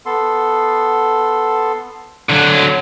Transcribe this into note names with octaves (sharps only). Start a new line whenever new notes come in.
B3 A4 C6
D3 F#3